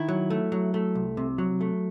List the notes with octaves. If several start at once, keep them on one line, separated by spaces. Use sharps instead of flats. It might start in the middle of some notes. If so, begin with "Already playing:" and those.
Already playing: D#3 E4
F#3
A3
F#3
A3
C2
C3
F#3
A3